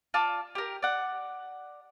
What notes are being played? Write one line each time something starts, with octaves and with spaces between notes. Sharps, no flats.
F4 D5 A5 D6
G4 A#4
D5 F#5